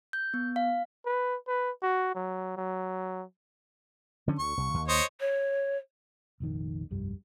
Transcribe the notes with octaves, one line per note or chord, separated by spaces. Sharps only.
G6
B3
F5
B4
B4
F#4
F#3
F#3
D3 F3 C#4
D2 C#6
C2
D#2
C5 C#5 D#5
C#5
F1 A#1 D#3
F1 C2 G2 G3